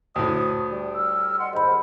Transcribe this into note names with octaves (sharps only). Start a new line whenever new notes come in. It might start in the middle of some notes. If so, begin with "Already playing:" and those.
D2 A2 D#6
G3
E6 F6
D#5 F#5 C6
D#2 G#2 C5 D#5 B5